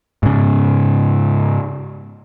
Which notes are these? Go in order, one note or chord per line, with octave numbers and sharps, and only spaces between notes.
G#2 C#3